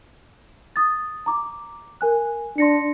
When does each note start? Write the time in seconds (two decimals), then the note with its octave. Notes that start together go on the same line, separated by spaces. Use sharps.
0.76 D#6 A6
1.26 A#5 D6
2.01 A#4 G#5 F#6
2.58 D4 C6 A#6 C#7